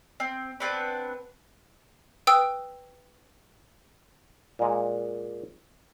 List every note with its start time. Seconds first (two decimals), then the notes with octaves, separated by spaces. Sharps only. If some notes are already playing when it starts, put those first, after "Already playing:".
0.20 C4
0.60 B3 C4 D4 B4
2.27 B4 G5 D#6 E6
4.59 A#2 G#3